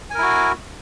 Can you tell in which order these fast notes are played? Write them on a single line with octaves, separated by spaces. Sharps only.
G#5 A#4 E4 F#4